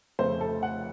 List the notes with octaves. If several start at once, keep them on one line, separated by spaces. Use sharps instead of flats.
F1 F2 C#3 A3 C5
A4
F#5